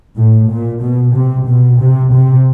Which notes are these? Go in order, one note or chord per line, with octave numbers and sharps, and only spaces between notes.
A2
A#2
B2
C3
B2
C3
C3